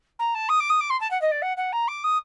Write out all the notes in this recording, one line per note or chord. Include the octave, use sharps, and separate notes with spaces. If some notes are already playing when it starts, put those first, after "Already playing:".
A#5
A5
D#6
D6
D#6
D6
C6
A5
F#5
D#5
D5
F#5
F#5
A#5
D6
D#6